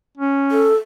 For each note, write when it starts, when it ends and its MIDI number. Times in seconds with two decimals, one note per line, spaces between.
0.17 0.69 61
0.51 0.76 69